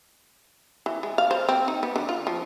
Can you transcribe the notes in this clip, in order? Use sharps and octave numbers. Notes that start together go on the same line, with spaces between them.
E3
G#3
F5
C5
C4
D#4
B3
D3
F4
F3